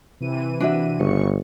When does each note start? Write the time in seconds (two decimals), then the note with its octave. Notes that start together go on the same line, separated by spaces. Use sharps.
0.21 C3 E3 D#7
0.61 D4 F#4 E5
0.99 G1 C#3 C#6 C#7